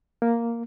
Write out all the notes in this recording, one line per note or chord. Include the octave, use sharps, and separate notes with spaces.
A#3